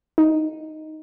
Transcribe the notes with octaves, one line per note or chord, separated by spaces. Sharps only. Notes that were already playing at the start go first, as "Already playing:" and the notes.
D#4